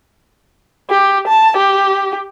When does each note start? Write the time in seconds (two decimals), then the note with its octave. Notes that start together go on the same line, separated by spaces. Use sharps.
0.90 G4
1.27 A5
1.57 G4